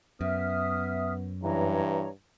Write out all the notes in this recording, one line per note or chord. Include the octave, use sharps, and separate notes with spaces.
F#2 B3 E5 D#6 F6
G2 E3 C#5 A#5